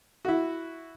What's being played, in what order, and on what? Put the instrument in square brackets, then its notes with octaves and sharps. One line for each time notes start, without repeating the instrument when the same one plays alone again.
[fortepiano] E4 F#4